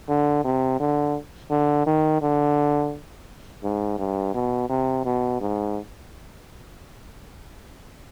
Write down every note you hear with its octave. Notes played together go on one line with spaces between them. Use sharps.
D3
C3
D3
D3
D#3
D3
G#2
G2
B2
C3
B2
G#2